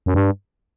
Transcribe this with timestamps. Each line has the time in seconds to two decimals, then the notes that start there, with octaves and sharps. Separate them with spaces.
0.06 F#2
0.14 G2